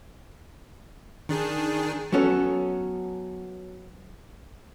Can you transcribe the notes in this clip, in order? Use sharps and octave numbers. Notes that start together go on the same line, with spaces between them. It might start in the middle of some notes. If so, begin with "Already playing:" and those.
D#3 D4 G#4
F#3 B3 C#4 A4 C#5